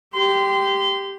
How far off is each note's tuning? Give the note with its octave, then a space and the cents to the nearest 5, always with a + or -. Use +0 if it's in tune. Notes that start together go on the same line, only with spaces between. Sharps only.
G4 +0 C6 -25